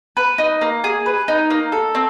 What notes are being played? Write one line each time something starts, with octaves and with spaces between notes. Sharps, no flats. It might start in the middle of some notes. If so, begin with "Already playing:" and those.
B4
D#4
A#3
G#4
B4
D#4
A#3
A4
C4